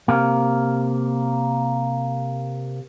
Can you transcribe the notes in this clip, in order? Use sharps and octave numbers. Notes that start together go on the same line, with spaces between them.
C3 A#3